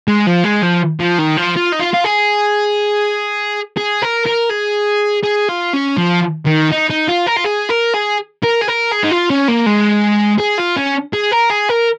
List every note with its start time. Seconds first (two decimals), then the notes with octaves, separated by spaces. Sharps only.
0.08 G#3
0.27 F3
0.45 G#3
0.63 F3
1.00 F3
1.18 D#3
1.37 F3
1.56 F4
1.72 D#4
1.79 F4
1.93 F4
2.04 G#4
3.77 G#4
4.02 A#4
4.26 A#4
4.50 G#4
5.24 G#4
5.49 F4
5.74 C#4
5.97 F3
6.46 D#3
6.72 D#4
6.90 D#4
7.08 F4
7.27 A#4
7.37 F4
7.45 G#4
7.70 A#4
7.94 G#4
8.44 A#4
8.62 G#4
8.68 A#4
8.92 G#4
9.04 D#4
9.11 F4
9.30 C#4
9.48 A#3
9.66 G#3
10.40 G#4
10.59 F4
10.77 C#4
11.14 G#4
11.32 A#4
11.51 G#4
11.69 A#4